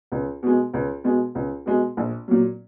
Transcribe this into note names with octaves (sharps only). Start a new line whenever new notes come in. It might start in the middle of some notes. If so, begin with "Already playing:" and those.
C#2
B2 G#3
C#2
B2 G#3
C#2
B2 G#3
A#1
A#2 F#3